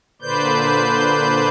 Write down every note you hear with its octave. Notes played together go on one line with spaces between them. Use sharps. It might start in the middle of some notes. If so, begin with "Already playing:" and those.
A#2 D3 B4 C5 D5 G6